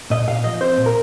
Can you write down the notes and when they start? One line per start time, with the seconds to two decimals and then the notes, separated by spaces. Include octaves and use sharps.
0.10 A#2 D#5
0.27 A#2 F5
0.44 F3 D#5
0.61 C4 C5
0.77 A#2
0.86 A#4